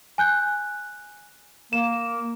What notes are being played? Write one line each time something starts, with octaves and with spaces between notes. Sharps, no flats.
G#5 F#6 G6
A#3 E7